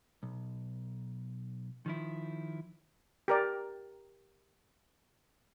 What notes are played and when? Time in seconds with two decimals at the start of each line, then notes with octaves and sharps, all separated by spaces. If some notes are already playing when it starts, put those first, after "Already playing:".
0.23 B1
1.86 D#3 F3 E4
3.28 G4 A#4 D5